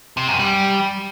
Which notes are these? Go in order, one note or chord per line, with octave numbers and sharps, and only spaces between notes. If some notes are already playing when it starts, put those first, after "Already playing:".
C3
F#2
G3